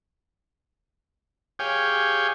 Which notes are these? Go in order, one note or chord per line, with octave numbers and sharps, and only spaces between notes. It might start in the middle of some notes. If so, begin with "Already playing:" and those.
G4 G#4 C#5 F5 G5 G#5